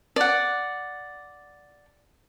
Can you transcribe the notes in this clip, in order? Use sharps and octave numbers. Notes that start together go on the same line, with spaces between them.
D5 F#5